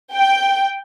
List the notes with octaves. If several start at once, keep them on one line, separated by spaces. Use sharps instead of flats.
G5